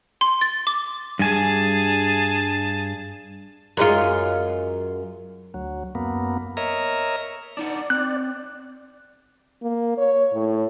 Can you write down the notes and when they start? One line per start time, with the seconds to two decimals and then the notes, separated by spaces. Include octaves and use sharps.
0.21 C6
0.41 A6
0.67 D6
1.19 G2 G#4 G#5 A5
3.77 F#2 G#3 F4
5.54 D2 F#3
5.95 F#2 A#3 B3
6.57 A#4 C#5 D#5 E5 A#5
7.57 D4 D#4 D5 F#5
7.90 C4 F#6
9.62 A#3
9.98 C#5
10.33 A2